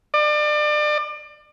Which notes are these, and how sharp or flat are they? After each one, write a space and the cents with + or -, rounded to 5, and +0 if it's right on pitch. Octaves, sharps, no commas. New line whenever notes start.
D5 +35